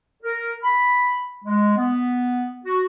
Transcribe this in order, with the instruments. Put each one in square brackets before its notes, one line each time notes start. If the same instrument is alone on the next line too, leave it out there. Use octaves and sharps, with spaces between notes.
[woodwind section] A#4
B5
G#3
B3
F#4